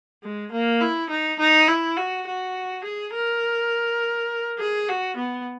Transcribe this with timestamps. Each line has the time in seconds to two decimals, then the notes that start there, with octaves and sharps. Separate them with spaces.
0.23 G#3
0.52 A#3
0.81 E4
1.10 D#4
1.40 D#4
1.68 E4
1.97 F#4
2.27 F#4
2.84 G#4
3.14 A#4
4.59 G#4
4.88 F#4
5.17 B3